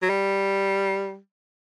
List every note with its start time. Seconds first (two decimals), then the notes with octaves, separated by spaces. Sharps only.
0.02 F#3
0.09 G3